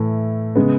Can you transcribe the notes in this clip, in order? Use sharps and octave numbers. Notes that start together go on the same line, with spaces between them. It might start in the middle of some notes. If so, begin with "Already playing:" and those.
Already playing: A2 E3 A3
C#3 G#3 B3